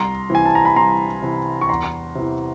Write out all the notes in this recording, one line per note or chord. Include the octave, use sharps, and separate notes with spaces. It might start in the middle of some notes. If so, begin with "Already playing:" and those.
Already playing: C2 A#5 C6
C3 E3 G#5
A5
A#5
B5
C2 A#5 C6
C3 E3
C#6
E2 A#5 C6
C3 E3